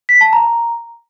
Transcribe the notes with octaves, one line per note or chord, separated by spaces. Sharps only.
B6
A5
A#5